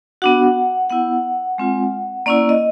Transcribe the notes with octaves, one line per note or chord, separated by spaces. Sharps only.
B3 D4 F#4 F#5
B3 E4 F#5
G#3 C4 F4
A#3 C#4 E4 D5
D#5